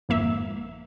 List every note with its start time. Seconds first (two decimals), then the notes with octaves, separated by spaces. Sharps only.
0.09 G#1 F2 A#3 E5